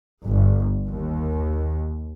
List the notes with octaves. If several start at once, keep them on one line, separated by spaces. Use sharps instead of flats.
G1
D#2